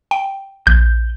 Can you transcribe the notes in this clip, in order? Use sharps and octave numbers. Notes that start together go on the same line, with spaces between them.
G5
A#1 G6